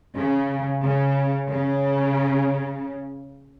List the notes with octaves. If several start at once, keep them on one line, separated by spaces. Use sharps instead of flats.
C#3
C#3
C#3